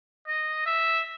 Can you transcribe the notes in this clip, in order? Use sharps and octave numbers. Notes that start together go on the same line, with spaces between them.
D#5
E5